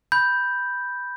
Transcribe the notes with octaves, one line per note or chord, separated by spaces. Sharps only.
B5 G6